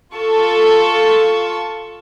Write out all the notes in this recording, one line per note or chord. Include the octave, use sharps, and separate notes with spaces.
F4 A4 A5 C#6